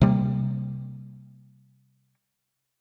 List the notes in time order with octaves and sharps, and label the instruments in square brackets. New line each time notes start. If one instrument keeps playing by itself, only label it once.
[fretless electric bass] C3 G3 A#3